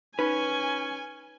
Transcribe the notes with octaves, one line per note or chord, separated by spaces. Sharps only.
C#4 D#4 B4 G#5